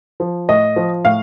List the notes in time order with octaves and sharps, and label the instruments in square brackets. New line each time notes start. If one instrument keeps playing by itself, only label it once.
[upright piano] F3
A2 D#5
F3
A2 F5